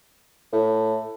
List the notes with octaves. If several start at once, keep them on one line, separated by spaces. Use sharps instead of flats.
A2